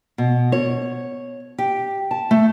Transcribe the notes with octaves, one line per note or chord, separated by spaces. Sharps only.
B2
C#5
G4
A5
A3